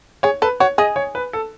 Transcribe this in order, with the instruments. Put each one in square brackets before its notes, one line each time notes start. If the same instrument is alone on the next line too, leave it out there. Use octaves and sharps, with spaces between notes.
[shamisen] G#4 [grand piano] C#5
[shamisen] A4 [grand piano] B4
[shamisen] F#4 [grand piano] C#5
[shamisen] G#4 [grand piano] D#5
[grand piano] C#5
B4
A4